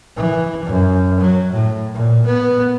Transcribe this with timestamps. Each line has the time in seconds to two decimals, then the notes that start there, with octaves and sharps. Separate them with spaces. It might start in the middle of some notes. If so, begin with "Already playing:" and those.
0.16 E3
0.65 F#2
1.20 F#3
1.53 A2
1.94 A#2
2.26 B3